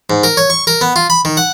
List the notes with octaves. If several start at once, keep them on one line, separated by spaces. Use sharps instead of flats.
G#2
A#4
C#5
C#6
A#4
B3
F4
B5
D#3
F#5